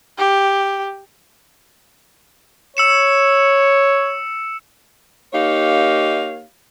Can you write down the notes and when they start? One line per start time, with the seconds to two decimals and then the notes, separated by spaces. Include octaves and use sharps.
0.18 G4
2.77 C#5 E6 C#7 E7
5.33 A#3 D#4 G4 C#5 F5